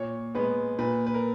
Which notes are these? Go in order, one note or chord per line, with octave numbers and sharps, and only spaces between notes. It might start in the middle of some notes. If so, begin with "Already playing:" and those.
Already playing: A#2 C#5
G#3 B3 B4
A#2 B4
B4
A#4